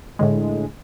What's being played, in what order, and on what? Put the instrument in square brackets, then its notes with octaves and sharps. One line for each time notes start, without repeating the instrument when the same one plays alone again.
[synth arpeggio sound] A2 D3 G#3